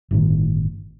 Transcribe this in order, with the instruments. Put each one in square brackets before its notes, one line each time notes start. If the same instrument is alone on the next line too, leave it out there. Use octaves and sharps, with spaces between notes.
[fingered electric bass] G1 A2 D#3